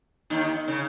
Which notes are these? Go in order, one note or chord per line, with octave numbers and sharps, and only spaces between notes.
D#2 D#3
C#3